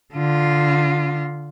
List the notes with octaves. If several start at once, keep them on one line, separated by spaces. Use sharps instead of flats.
D3 F4